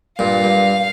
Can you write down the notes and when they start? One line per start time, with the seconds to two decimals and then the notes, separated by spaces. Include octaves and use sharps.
0.19 G2 A#2 F5
0.44 G2